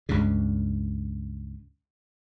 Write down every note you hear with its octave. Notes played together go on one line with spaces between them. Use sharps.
C#2 G2 C#3